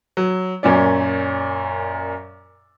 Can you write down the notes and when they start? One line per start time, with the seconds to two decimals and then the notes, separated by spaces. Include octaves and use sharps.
0.17 F#3
0.63 F#2 A#2 C#4 D5